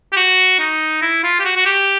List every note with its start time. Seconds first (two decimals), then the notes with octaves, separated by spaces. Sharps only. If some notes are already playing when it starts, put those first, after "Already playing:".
0.13 G4
0.17 F#4
0.59 D#4
1.02 E4
1.24 F4
1.40 G4
1.45 F#4
1.57 F#4
1.65 G4